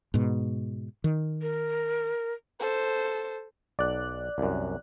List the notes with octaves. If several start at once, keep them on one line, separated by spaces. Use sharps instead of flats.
G#2 B2
D#3
A#4
A4 C5
B1 D5 F#6
C2 F#2